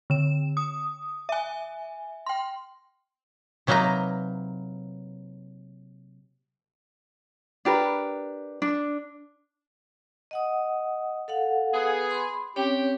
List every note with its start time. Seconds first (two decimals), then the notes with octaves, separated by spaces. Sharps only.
0.10 D3 E7
0.57 D#6
1.29 E5 G#5
2.26 G5 C6
3.67 C3 F#3 A#3 D#4 B4 A#5
7.65 D4 G4 A#4 B4
8.62 D4
10.31 D#5 F#5 D#6
11.28 A4 F5 F#5
11.73 B3 G#4
12.11 B5 C6
12.56 C4 C#4 G4 C#5